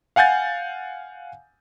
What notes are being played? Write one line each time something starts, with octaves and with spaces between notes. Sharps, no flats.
F5 F#5 G#5 G6 A6